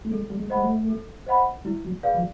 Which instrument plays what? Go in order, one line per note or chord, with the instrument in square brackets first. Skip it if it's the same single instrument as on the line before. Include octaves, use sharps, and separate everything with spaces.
[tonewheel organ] A3
[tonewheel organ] G#3 [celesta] A4
[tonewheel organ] G3
G#3
[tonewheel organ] G#3 [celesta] C5 D#5 F#5 B5
[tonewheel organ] A3
[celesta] A4
C5 D#5 F#5 B5
[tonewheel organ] G3 [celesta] E4
[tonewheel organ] F#3
[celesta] G#4 B4 D5 F5
[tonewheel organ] F3